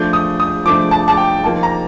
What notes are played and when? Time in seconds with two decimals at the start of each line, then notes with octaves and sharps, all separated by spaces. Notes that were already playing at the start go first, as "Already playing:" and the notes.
Already playing: F3 A3 D4 G6
0.13 D#6
0.40 D#6
0.66 F3 A3 D4 D6
0.91 A5
1.08 A5
1.17 G5
1.43 F3 A#3 D#4 A5
1.63 A#5